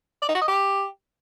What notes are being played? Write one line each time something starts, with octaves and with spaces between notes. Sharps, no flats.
D5
D#4
F#4
D#5
G4